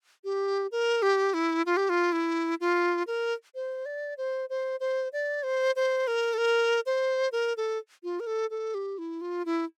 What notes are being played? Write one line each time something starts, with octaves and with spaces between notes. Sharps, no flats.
G4
A#4
G4
E4
F4
G4
F4
E4
F4
A#4
C5
D5
C5
C5
C5
D5
C5
C5
A#4
A4
A#4
C5
A#4
A4
F4
A#4
A4
A4
G4
E4
F4
E4